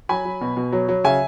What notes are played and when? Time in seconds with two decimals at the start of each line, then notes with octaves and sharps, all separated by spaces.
0.09 F#3 G#5 B5
0.25 F#3
0.41 B2
0.57 B2
0.72 F#3
0.88 F#3
1.04 C#3 E5 G#5